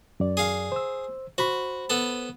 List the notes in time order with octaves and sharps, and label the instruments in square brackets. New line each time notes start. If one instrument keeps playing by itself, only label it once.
[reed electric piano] F#2 D5
[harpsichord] G#4 F5
[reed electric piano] C5 E6
[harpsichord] F#4 [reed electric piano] C5 B5
[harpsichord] B3 A4